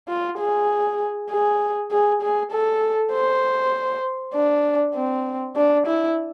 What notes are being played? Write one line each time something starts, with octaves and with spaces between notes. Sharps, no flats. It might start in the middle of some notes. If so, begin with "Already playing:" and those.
F4
G#4
G#4
G#4
G#4
A4
C5
D4
C4
D4
E4